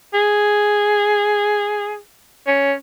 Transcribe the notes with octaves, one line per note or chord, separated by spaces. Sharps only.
G#4
C#4